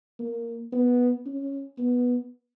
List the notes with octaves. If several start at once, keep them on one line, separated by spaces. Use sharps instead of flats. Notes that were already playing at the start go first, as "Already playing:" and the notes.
A#3
B3
C#4
B3